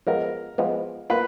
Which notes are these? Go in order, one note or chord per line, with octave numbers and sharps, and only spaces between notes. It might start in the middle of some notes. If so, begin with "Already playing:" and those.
F3 G#3 B3 A#4
F3 G#3 B3
A#3 F4 B4